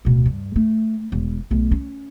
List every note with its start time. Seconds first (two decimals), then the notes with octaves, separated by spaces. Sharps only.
0.05 D1 B2
0.26 G2
0.56 A3
1.12 E1
1.51 B1 A3
1.72 C#4